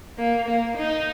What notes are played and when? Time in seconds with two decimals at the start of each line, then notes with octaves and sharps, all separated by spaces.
0.18 A#3
0.48 A#3
0.77 D#4